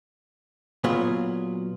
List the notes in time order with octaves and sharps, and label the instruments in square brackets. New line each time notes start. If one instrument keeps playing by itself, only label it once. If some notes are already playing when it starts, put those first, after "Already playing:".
[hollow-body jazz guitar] A#2 F#3 B3 F4 G#4